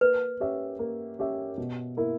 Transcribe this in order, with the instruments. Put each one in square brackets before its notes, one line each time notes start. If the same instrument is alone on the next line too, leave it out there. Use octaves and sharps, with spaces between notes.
[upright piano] A#3 [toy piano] B4
[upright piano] C#4 G4 C#5 E5
A#3
C#4 G4 C#5 E5
B2
A#3 E4 A#4